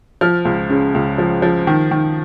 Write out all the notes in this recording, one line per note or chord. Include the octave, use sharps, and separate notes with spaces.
F3 F6
C#2
C#3
C#2
F3
F3
D#3
D#3